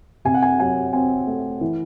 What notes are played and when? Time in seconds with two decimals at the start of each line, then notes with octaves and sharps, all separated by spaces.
0.25 C3 G#5
0.34 F#5
0.42 G#5
0.60 F#3 G#5
0.93 C4 G#5
1.27 A3
1.61 E3